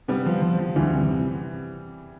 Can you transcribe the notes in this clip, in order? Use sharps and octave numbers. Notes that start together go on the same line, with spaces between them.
C3 G3 B3
F3
F3
F3
D2 E3 G3
C3
C3